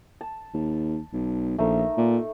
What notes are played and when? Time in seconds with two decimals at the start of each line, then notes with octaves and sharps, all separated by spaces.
0.21 A5
0.54 D#2
1.13 B1
1.58 A#1 A3 D#4 A#4
1.97 A#2